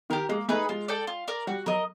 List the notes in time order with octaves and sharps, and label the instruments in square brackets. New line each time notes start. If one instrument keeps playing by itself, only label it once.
[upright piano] D#3 [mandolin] G4 A#4
[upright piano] G#3 [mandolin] A#3
[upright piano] A3 [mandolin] D#4 G#4 B4
[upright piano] G#3 [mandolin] F4
[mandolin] A4 D5 G5
F4
A#4 D5
[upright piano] G3 [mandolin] F#4
[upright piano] F#3 [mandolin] A#4 D#5